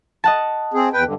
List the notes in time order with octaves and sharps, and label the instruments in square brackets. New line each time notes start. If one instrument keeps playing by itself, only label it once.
[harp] D#5 F#5 A5
[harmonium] C4 G#4
E2 B4 G5
G2 D3